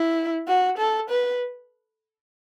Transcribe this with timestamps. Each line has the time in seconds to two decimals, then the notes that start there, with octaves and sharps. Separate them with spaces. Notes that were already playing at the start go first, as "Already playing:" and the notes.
Already playing: E4
0.48 F#4
0.78 A4
1.10 B4